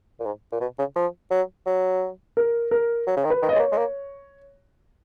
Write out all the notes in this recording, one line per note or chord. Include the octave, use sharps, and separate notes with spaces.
A#2
G#2
A#2
B2
C#3
F3
F#3
F#3
A#4
A#4
F#3
C#3
D#3
B4
D#3
D#5
G#3 C#5
A#3
G#3
A#3